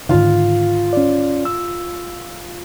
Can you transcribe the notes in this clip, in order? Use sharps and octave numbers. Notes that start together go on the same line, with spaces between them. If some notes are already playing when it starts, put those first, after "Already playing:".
G#2 D3 D#3 F4 F5
C#4 D5
E6